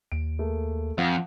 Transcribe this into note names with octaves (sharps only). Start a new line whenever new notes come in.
D#2 D7
A3 A#3 G#4
F2 F3 F5 F#5